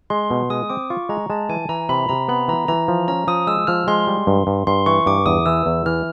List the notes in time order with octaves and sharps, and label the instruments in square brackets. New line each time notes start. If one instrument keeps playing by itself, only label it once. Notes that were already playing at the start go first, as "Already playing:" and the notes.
[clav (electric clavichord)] G#3 [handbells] C6
[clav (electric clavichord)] B2
[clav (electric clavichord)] G#3 [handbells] D#6
[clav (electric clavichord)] C4 [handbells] D6
[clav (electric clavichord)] F4 [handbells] C#6
[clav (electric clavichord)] G#3 [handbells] A#5
[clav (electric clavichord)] G#3 [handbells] A5
[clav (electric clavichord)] E3 [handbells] G#5
[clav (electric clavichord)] E3 [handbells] A#5
[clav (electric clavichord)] C3 [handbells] B5
[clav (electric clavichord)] C3 [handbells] A#5
[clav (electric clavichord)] B3 [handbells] B5
[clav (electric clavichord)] E3 [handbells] A#5
[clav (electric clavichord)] E3 [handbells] A#5
[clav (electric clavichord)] F3
[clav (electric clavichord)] C#4 [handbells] A#5
[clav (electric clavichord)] F3 [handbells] D#6
[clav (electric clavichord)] G#3 [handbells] E6
[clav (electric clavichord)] F3 [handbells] F6
[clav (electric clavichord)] G#3 [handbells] C6
[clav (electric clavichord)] G3
G2
G2
[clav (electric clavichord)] G2 [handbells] C6
[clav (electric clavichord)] E3 [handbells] C#6
[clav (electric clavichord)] G2 [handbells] D6
[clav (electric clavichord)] E2 [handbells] D#6
[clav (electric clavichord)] E3 [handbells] E6
[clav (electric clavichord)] E2
[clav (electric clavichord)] E3 [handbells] F6